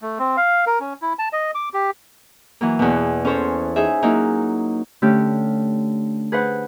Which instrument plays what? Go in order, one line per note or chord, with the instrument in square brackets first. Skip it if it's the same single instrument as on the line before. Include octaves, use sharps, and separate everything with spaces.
[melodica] A3
C4
F5
A#4
C#4
E4
A5
D#5
D6
G4
[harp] E3 F#3 A#3
E2 B2
C#4 A4 C5 C#5
D#4 G#4 E5
F#3 A#3 C#4 D#4 E4
D3 A3 C#4 G4
G#4 B4 C5 F#5